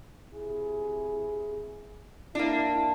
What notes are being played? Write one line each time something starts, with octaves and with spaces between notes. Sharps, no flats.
C3 E4 G#4
A#3 D4 E4